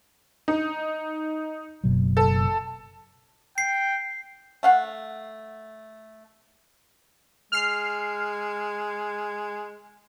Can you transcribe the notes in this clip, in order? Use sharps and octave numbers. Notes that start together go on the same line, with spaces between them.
D#4
F#1 B2 F#3
A4
G5 C7
A3 F5 F#5
G#3 F6 C7